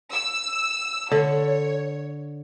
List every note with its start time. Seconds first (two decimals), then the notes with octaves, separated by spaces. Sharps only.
0.12 E6
1.12 D3 C#5